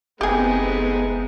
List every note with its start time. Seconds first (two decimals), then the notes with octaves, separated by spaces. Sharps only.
0.21 F#1 G#3 A3 B3 C4 D#4 G4 G#4